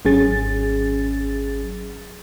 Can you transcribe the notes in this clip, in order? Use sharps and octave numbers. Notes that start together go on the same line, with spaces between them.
G#1 F#3 C#4 G#4 A6